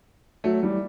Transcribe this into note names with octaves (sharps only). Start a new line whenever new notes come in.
F#3 A3
E3 G3